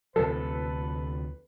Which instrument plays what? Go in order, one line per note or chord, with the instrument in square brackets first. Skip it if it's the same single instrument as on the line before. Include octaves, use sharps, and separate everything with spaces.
[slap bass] D2 C3 F3 [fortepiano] A4 [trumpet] B4